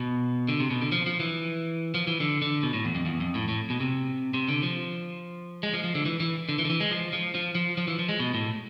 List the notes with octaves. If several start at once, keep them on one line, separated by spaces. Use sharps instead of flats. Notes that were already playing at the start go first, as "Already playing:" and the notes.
Already playing: B2
D3
C3
B2
D3
F3
F3
E3
F3
E3
D3
D3
B2
A2
E2
F2
E2
F2
A2
A2
B2
C3
C3
D3
F3
G#3
F3
F3
D3
E3
E3
D3
E3
D3
E3
G#3
F3
F3
F3
F3
F3
E3
F3
G#3
B2
A2